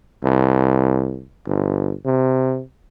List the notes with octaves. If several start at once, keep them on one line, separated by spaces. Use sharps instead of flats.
C2
G1
C3